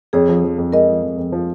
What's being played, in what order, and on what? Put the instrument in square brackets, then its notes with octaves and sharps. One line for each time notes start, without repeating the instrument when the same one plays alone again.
[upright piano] F2 [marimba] G#4 C#5
[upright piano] F3
F3
F2
[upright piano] G#3 [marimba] A#4 D#5
[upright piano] F3
F2
F2
F3